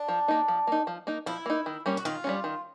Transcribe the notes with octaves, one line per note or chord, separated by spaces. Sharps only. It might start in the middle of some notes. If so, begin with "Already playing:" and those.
Already playing: D4
F3
A#3 D#4
F3
A#3 D#4
F3
A#3 D#4
F3 E4
A#3 D#4
D#3
G3 A#3 C#4
F#4
D#3 F4
G3 A#3 C#4
D#3